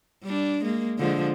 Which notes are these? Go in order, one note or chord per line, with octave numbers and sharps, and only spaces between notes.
G3 D4
G#3 A#3
D3 F3 G#3